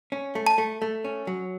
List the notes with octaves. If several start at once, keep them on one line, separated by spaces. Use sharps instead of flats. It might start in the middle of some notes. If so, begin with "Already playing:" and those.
C#4
A3
A5
A3
A3
C#4
F#3